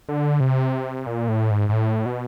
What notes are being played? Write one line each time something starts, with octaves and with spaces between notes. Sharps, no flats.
D3
C3
A#2
A2
G#2
G#2
A2
B2